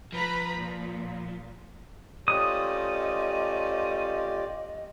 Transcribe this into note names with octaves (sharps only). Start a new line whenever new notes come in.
F3 B4 A#5 B5
A#2
A3 C#4 F4 G4 C5 D5 D#5 D#6